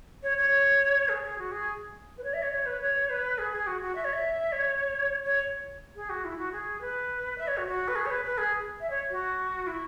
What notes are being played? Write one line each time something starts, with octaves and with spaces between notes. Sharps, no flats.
C#5
C#5
G#4
G#4
F#4
G#4
B4
C#5
E5
C#5
C#5
B4
C#5
B4
G#4
G#4
F#4
F#4
E5
C#5
E5
C#5
C#5
G#4
F#4
E4
F#4
G#4
B4
E5
C#5
F#4
F#4
B4
G#4
C#5
B4
B4
G#4
E5
C#5
F#4
E4